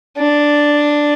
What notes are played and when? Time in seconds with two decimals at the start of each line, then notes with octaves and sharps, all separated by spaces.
0.18 D4